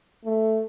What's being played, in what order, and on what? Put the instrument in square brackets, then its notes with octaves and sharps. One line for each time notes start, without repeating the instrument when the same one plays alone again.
[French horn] A3